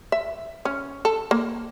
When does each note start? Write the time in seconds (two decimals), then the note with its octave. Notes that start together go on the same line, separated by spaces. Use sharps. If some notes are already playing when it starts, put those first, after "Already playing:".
0.12 E5
0.65 C#4
1.05 A4
1.31 A#3